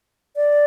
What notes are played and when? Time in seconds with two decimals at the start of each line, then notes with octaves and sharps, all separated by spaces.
0.36 D5